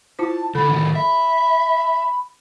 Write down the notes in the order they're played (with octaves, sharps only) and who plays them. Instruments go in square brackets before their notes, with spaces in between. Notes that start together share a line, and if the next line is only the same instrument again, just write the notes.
[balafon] E4 F4 C5 [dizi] A5
[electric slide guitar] D3 D4 [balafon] A4 [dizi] B5
[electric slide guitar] A2 D#3 A3
[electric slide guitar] E5 [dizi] B5